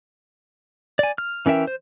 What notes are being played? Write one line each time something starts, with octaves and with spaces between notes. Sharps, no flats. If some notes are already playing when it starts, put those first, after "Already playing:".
D5 G#5
F6
E3 C#4 A#4 E5 G5
C5